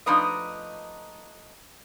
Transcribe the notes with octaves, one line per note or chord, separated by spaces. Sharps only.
F3 A3 D4 D#4 B4 D#5